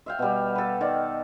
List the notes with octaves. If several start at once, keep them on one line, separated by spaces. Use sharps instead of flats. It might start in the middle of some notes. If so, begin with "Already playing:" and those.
E5 F5 G5
B2 G3
A4 B4
D#3 D5